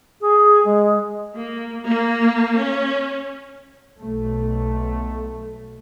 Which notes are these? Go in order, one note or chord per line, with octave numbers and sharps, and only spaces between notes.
G#4
G#3
A#3
A#3
C#4
B1 A3